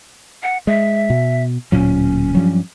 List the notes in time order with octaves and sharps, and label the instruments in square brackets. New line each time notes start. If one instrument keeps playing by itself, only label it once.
[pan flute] F#5
[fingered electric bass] G#3 [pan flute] E5
[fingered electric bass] B2
[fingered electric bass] D1 A#2 F#3 [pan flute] C#4
[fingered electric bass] G2 F3 F#3